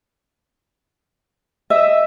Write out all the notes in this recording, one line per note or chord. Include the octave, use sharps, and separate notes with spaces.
D#5 E5